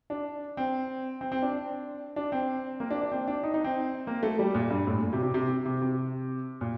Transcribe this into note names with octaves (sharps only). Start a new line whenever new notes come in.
D4
C4
C4
C4
D4
D4
C4
A#3
D4
D4
C4
D4
D#4
D#4
C4
A#3
A3
G3
A#2
G2
A2
A#2
C3
C3
C3
C3
C3
A#2